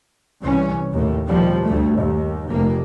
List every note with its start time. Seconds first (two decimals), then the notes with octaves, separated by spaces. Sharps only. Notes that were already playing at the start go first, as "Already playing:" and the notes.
0.40 C2 E3 C#4
0.93 D#2 A2
1.27 D#2 B2 F3 G3
1.65 D2 G2 A3
1.96 D#2
2.49 F1 A#3